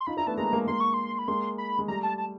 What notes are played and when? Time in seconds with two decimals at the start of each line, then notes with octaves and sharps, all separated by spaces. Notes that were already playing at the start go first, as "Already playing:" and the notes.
0.01 C6
0.07 D#4 F4 B5
0.17 D4 E4 A#5
0.27 A3 B3 A5
0.37 G#3 A#3 A#5
0.53 G#3 A#3
0.67 G#3 A#3 C6
0.80 C#6
0.94 C6
1.19 B5
1.28 G#3 A#3 C6
1.58 B5
1.79 G#3
1.88 G3 A3 A#5
2.03 A5
2.18 A5